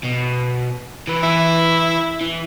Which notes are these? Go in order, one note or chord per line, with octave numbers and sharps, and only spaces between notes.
B2
E3 B4
E4
E3